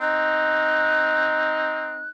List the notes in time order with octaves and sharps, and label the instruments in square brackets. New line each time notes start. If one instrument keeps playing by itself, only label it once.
[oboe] C4 [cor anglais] D#4 [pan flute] F#6